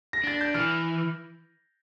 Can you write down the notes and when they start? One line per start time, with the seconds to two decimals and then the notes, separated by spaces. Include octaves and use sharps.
0.13 A#6
0.24 D4 A6
0.41 G6
0.54 E3 F6